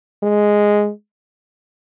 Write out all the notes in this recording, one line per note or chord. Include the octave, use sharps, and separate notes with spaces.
G#3